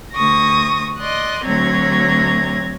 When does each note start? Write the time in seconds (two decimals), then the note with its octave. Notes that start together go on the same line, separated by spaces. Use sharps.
0.14 D2 C#6 D#6 A#6
0.97 D5 D#5 C6 D#6 F#6
1.45 D2 F#3 C4 C#5 A#5 G#6